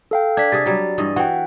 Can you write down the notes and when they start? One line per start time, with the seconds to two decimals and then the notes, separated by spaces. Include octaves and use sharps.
0.11 A4 F5 G5
0.37 D4 G#6 B6
0.52 C3 G#4 A6
0.66 F#3 G3
0.98 G2 E3 D#5
1.16 E3 F#4 F#5 G5